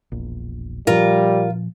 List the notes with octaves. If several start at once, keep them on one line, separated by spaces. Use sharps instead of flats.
E1 A#1
A#2 F3 G3 F4 A#4